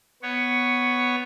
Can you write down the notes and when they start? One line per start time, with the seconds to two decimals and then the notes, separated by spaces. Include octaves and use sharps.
0.22 B3 C#5